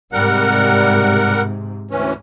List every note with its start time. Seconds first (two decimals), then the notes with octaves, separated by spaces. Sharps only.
0.12 G#2 C3 G3 A#4 F#5
1.91 D2 E3 C#4